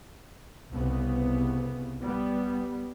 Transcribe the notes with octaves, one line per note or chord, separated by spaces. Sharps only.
C2 C#3 B3
G3 B3